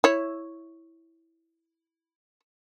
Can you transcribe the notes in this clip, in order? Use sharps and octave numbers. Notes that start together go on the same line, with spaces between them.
E4 C#5